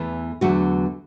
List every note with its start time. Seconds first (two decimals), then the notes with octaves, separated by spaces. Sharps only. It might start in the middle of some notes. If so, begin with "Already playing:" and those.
Already playing: E2 E3 A3
0.41 E2 D3 F#3 A3 F#4